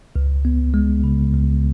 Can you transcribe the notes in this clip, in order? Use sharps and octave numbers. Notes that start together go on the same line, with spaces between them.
C#2
B3
G#3
C#3
C#2